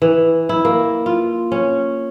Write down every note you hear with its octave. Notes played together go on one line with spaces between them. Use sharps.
E3
E4
A#3
F4
C#4